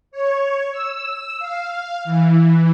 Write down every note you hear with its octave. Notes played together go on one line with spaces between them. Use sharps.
C#5
E6
F5
E3